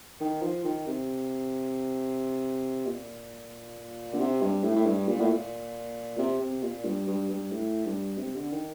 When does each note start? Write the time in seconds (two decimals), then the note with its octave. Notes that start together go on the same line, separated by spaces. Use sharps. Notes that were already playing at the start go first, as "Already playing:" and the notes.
0.21 D#3
0.42 F3
0.65 D#3
0.87 C3
2.86 A#2
4.13 D3
4.19 C3
4.42 G2
4.64 A2
4.76 A2
4.86 G2
5.08 A#2
5.20 A2
5.30 A#2
6.18 C3
6.40 C3
6.63 A#2
6.85 G2
7.08 G2
7.30 G2
7.52 A2
7.85 G2
8.18 C3
8.35 D3
8.52 D#3